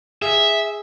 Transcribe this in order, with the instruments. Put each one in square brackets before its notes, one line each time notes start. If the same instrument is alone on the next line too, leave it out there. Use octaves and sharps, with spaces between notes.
[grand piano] G#4 [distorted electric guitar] E5